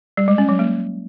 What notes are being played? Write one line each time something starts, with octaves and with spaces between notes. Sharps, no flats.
G3
G#3
C#4
F#3
A#3